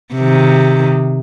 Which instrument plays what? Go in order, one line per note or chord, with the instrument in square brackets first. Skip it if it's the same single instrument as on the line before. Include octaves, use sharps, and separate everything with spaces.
[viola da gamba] C3 D#3